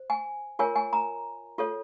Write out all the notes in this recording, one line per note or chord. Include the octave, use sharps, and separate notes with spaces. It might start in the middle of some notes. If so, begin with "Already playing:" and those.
Already playing: C5
G#5
F4 A#4 C#5 G#5
G#5
A#5
F4 A4 C#5